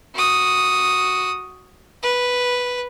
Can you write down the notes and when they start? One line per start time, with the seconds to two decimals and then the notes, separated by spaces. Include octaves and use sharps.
0.14 F#4 D#6
2.03 B4